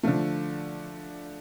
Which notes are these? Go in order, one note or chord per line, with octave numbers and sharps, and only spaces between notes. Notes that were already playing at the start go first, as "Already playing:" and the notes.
D3 F3 A3